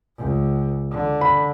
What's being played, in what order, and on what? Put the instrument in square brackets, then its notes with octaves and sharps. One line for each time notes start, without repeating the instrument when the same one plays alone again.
[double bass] C#2
D3
[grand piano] B5